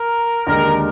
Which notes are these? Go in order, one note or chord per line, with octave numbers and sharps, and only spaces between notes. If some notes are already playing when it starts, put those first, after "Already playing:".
Already playing: A#4
D#2 D3 G#3 A#4